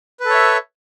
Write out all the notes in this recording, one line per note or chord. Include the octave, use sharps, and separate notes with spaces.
A4 B4 C#5 E5